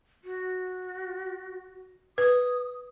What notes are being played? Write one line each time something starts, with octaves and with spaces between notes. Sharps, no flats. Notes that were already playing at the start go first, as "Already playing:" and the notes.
F#4
B4 D#6